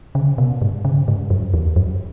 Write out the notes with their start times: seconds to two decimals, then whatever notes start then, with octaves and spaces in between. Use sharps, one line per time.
0.15 C#3
0.38 B2
0.62 G#2
0.85 C#3
1.08 G#2
1.30 F#2
1.54 E2
1.76 F#2